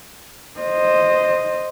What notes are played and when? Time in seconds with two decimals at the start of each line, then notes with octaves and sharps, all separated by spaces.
0.60 C5 D#5